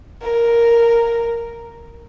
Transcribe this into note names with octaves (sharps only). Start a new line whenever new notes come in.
A#4